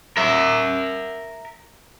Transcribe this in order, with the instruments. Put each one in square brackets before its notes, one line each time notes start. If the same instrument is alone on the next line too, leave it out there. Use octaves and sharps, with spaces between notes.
[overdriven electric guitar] A#4 E5